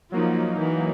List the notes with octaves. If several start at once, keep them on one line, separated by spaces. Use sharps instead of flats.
F3 F#3 A#3 D#4
E3